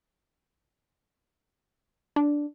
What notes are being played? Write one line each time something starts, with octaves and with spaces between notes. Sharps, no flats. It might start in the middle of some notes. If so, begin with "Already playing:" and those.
D4